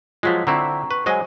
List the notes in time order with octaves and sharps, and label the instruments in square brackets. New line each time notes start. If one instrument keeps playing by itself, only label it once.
[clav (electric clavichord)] F3 F#3 G#3 [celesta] F4 B6
[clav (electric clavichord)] D3 C4 E4 [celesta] A#5 C#6
[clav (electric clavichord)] B4 [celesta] C#6
[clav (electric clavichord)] F#3 G#3 D#5 [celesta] C5 G#5